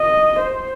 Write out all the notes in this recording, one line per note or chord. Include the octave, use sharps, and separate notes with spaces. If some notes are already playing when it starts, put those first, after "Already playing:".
Already playing: D#5
C5